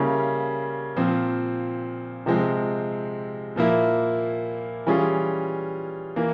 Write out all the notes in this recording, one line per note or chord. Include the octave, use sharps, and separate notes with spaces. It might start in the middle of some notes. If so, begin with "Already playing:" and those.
Already playing: C#3 G3 A#3 C#4 E4
A#2 F3 C4
C3 F3 G#3 C4
A#2 F3 A#3 E4
E3 G3 C#4 F4 G#4
E3 A#3